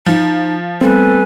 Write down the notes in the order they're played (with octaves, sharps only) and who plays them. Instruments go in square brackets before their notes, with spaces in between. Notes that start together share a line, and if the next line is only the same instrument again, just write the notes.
[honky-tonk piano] F3 [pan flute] D#4
[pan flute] G3 [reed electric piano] A3 B3 C4 [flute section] A4 B4 G#5